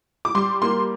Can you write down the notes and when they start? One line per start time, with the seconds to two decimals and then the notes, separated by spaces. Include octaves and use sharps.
0.25 D6
0.35 G3 C6
0.62 A#3 C6